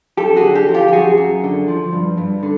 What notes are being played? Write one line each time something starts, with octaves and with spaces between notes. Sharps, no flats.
F#2 G4 A4
F#4 G#4
D3
G4 A4
F3
F4 G4
G4
F#2 F#4 G#4
F#2
D3
F3
G2
G2
D3